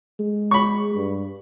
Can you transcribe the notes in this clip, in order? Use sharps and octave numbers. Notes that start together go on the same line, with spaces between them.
G#3
B5 C#6
G2